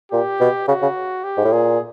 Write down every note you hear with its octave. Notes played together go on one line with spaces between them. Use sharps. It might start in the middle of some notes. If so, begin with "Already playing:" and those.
A#2 G4
B2
C#3 F#4
C#3
G4
G#2
A2
A#2 G#4